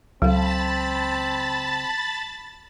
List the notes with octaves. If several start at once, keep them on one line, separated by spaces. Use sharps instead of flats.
C#2 F#3 C4 A4 F5 A5 B5 A6